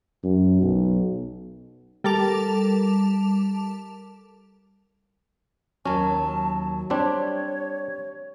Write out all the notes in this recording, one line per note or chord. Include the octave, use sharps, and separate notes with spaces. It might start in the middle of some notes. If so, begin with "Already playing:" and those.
F#2
B1
G3 A4 A#4 A5 D6 F7
D#2 F#3 C#4 A5
G3 C4 D4 G4 C#5